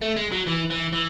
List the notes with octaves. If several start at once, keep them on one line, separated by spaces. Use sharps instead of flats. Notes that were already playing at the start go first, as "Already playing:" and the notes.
A3
G#3
F#3
E3
E3
E3